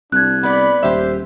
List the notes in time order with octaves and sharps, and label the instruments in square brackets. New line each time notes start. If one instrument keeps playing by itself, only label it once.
[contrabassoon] C2 [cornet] D4 [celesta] F#6 G#6
[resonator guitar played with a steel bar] B3 D5 [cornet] B5
[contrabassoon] D#1 [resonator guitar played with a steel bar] G4 E5 [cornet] C5